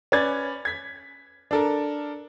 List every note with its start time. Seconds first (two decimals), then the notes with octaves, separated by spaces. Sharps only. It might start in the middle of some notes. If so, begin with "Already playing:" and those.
0.12 C#4 B4 D5 G#6 A6
0.65 G#6 B6
1.51 D4 A4 A#4